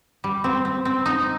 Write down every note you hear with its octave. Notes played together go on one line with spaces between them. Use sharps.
G3
C4
C4
C4
D#4